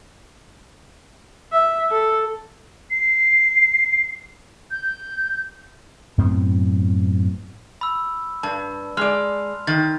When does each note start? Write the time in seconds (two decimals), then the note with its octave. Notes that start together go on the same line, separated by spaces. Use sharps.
1.53 E5
1.92 A4
2.91 C7
4.71 G6
6.18 F#2 A2 B3 C4
7.81 B5 E6
8.43 G2 A5
8.97 G#3 D5 C6 F6 F7
9.67 D#3 A6